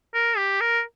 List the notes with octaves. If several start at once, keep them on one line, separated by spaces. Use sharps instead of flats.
A#4
G4
A#4